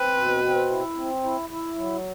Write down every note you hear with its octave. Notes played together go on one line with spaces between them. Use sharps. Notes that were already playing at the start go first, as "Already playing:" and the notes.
Already playing: C4 B4
B2
C4
E4
C4
E4
E4
F#3